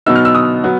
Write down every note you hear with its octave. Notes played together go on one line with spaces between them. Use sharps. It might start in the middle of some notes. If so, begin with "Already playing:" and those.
B2 F#3 B3 D#4 E6
F6
E6
D#6
F#3 B3